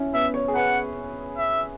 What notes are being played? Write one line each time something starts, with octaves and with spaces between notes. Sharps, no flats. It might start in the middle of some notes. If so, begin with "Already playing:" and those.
Already playing: C#4 E4
B3 E5
C#5
G#4
B4 F#5
E5